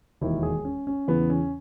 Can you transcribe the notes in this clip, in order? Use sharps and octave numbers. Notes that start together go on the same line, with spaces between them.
E1 D#2 D#3 E4
G#4
C#4
C#4
E2 C#3 E3 B3
C#4